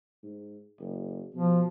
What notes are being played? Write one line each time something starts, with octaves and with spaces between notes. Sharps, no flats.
G#2
F#1
B2 F3